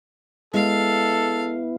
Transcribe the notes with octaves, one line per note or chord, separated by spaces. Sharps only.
G#3 B3 E4 A4 F5